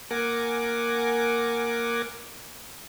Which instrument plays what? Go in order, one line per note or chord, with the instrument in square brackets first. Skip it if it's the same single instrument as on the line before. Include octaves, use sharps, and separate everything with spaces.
[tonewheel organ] A#3 A#4 F#5 G#5 D6